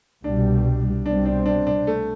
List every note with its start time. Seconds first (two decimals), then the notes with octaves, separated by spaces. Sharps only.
0.23 C2 B2 G3 D4
1.05 C2 B2 G3 C4 D4
1.26 D4
1.46 D4
1.67 D4
1.87 A3